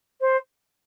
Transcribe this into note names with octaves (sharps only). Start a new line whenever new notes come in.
C5